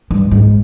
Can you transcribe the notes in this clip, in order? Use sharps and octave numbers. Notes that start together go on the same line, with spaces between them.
G2
G#2